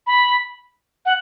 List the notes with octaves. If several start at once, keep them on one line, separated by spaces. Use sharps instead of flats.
B5
F#5